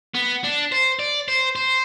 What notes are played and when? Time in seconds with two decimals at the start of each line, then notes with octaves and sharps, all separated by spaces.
0.14 B3
0.44 D4
0.72 C5
0.99 D5
1.28 C5
1.56 C5